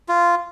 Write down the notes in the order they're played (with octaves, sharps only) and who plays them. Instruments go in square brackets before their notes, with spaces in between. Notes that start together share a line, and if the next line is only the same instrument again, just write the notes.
[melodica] F4